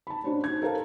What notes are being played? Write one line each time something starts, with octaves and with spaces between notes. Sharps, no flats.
A5 B5
C#4 D4 F#4 C5
D#4 G#6
A4 A#4 C5 F5 A5